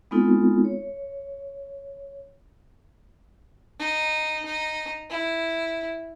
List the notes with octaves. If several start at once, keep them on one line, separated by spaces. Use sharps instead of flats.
G#3 B3 C4 D#4 F4 A4
C#5
D#4
D#4
E4